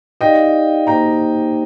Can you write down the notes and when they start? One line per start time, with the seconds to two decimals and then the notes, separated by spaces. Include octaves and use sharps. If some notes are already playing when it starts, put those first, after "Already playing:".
0.21 D#4 G4 D5 D#5 F5 G5
0.87 A#3 D#4 G4 C5 G5 A#5